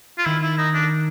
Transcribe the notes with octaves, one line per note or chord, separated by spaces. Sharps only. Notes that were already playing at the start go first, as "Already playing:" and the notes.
F4
D#3 E4
E4
D#4
D4